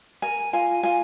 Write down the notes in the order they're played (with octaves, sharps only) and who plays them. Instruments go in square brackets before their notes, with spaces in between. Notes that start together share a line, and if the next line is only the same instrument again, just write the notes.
[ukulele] A#4 G#5
F4 G#5
F4 G#5